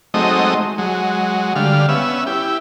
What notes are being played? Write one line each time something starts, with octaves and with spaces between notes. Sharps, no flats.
F#3 G#3 A3 C4 D#4 D#5
F#3 G#3
D3 G3 F5
B3 C#4 E5
E4 G4